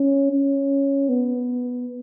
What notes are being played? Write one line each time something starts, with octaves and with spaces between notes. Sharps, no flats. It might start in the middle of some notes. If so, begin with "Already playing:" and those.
Already playing: C#4
C#4
B3